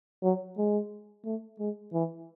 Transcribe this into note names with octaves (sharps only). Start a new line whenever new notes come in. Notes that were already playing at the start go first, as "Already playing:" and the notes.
F#3
G#3
A3
G#3
E3